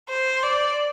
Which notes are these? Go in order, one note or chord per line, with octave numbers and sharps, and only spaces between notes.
C5
D5